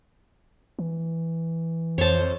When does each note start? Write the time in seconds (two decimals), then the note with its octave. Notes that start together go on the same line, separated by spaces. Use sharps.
0.79 E3
1.98 F2 C5 C#5 A5